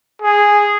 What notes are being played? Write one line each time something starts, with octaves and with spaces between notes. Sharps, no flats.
G#4